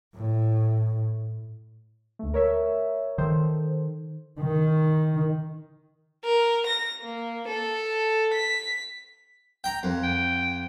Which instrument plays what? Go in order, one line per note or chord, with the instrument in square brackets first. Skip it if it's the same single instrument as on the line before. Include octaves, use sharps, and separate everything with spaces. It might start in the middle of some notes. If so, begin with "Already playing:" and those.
[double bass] A2
[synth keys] D2 A3
A#4 C#5 E5
[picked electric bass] D#3 [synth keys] A4 C5
[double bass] D#3
[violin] A#4
A#6
A#3
A4
B6
[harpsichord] G5 A#5
F2
[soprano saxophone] G5